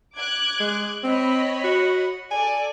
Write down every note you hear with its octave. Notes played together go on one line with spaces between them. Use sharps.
D6 F#6 G#6
G#3
C4 C#5 D#5 B5
F#4
A4 D5 G#5